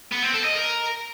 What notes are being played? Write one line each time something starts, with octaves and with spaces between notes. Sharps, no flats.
B3
C4
A4
D#5
A#4